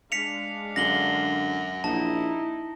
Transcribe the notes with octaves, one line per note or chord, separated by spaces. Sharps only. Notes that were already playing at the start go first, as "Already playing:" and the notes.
G#3 D4 F5 B6 C#7 F7
F#2 D3 A#6 F#7 G7
A#1 D#4 E4 A5